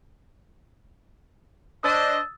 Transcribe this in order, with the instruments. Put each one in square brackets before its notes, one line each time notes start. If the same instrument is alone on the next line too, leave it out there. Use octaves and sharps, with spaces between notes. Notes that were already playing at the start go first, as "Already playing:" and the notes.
[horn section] D4 C5 D#5 [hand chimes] D#6 E6 A6